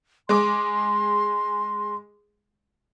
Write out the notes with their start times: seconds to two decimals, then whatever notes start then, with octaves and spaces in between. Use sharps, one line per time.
0.29 G#3 G#4 C6 D6